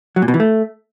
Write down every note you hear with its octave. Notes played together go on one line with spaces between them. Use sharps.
F#3
A#2
B2
E3
A3